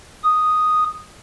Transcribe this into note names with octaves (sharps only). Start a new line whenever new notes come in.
D#6